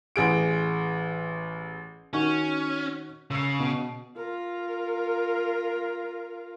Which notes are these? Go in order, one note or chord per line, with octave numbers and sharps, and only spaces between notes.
A1 G#4 D7
D#3 C#4 F#4
C#3 E6 C7
B2
F4 A#4